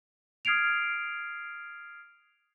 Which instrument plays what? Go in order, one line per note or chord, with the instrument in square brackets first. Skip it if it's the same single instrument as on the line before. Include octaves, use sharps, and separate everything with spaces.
[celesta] D#6 F6 G#6 C7 D7 F7